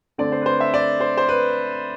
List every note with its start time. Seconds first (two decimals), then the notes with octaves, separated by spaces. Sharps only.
0.18 D3 A3 C4 D5
0.32 C5
0.41 B4
0.46 C5
0.60 E5
0.74 D5
1.00 C5
1.17 C5
1.29 B4